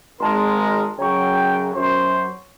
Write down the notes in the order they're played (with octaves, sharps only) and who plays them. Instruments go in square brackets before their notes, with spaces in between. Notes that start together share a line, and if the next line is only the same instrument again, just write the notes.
[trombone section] G#1 G#3 [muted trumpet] A#4 [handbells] A5 C6
[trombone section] F#2 C#3 F#3 [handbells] C#5 A#5 C#6 [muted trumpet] G5
[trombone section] F#2 [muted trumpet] C5